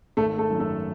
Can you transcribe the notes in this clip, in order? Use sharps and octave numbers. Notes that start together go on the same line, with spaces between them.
G#1 A3 A4
A3 A4
F#2 D#3
A3 A4